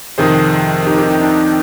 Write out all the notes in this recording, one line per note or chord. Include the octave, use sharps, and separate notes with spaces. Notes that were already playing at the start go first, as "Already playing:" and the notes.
F2 C3 D#3 G#4 C5
D#4 G4
D#4 G4
D#4
D4